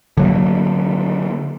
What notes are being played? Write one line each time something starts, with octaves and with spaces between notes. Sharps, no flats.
D3 F#3 A#3